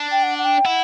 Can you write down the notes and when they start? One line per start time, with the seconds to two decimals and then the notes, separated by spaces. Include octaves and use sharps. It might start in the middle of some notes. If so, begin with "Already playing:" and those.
Already playing: D4
0.11 G5
0.23 F#5
0.38 F#5
0.44 G5
0.65 E4 F#5